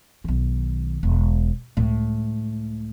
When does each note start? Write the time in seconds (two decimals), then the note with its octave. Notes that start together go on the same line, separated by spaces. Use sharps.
0.24 B1 D#3
1.03 E1
1.77 C#2 A2